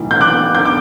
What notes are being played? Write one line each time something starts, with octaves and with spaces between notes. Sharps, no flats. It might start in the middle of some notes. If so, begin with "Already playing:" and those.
Already playing: B1 A2 E3
G6
D6 F#6
G6
D6